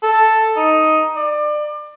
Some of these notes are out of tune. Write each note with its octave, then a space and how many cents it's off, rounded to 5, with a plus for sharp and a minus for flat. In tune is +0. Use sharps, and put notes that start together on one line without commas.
A4 +0
D#4 +5
D5 +25